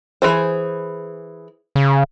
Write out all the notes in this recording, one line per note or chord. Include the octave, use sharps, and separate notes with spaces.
E3 G#4 C5
C#3